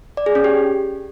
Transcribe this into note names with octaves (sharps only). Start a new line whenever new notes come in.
D5
G#4
C#4
G4